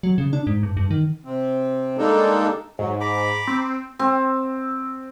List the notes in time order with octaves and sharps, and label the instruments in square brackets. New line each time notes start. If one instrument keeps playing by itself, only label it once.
[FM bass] F#3
C#3
D4
G#2
G2
G2
D#3
[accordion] C3 C4
G3 G#3 A#3 D4 D#4 A4
[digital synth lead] G#2 [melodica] F#3
[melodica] A#5 B5 D6
[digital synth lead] C4
[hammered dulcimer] C4